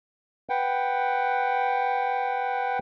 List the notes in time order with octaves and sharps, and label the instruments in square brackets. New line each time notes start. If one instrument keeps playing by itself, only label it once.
[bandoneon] B4 F#5 G5